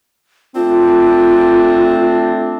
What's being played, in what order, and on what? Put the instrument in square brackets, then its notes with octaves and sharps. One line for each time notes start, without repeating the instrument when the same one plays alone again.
[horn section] A3 C4 D4 [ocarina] F4